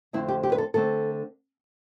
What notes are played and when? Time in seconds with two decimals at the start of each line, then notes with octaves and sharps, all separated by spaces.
0.13 F2 D3 A3 C4 E4
0.28 G4
0.43 G4
0.52 B4
0.58 A4
0.74 D3 A3 C4 A4